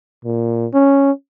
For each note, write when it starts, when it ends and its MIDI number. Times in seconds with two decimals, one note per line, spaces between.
0.25 0.66 46
0.74 1.11 61